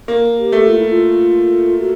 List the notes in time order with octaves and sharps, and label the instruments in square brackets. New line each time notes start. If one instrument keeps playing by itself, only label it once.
[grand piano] A#3
[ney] G4
[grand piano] A3
[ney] F4
E4
F4
F#4